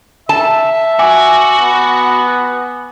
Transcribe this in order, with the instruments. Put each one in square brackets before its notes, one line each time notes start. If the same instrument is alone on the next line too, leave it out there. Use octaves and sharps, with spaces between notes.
[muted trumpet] E5 [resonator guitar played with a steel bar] A5
[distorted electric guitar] F#4 [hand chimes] G#5 D6
[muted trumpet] B3